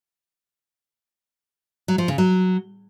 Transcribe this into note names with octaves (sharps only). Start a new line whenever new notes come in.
F#3
F3
C#3
F#3